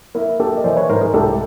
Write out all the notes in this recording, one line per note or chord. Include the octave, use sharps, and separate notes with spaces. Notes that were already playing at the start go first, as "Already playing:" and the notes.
A#3 E4
A#3 G4 A4
D#5
E3 C5 D5
B4 C#5
G#2 A#4 C5
G#4 A#4
C2 G4 A4